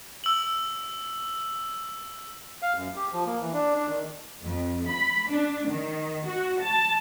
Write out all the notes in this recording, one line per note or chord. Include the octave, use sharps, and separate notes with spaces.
E6 F#7
F5
F#2
G4
F3
A#3
E3
D4
D4
D#3
F2
B5
D4
D#3
F#4
A5